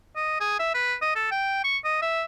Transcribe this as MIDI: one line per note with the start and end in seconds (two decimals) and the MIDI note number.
0.16 0.40 75
0.40 0.57 68
0.59 0.70 76
0.74 0.95 71
1.02 1.14 75
1.15 1.29 69
1.31 1.63 79
1.64 1.78 85
1.84 1.98 75
2.02 2.24 76